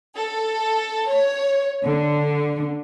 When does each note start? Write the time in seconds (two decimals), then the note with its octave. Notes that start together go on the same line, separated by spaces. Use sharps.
0.16 A4
1.09 C#5
1.83 D3